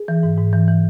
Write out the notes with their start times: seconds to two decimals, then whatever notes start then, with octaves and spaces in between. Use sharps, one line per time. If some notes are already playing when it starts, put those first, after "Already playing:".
Already playing: G#4
0.08 E3
0.23 G#2
0.38 G#2
0.53 E3
0.68 E3